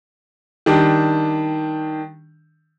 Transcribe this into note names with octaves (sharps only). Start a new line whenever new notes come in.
D#3 G3 D4